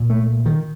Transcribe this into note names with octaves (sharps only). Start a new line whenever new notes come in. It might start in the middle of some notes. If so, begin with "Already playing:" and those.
Already playing: C2 A#2
A3
D#3